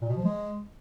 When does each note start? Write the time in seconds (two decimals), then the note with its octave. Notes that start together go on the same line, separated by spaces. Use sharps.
0.02 A#2
0.09 B2
0.17 F3
0.24 G#3